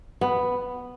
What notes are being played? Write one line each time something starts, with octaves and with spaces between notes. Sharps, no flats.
B3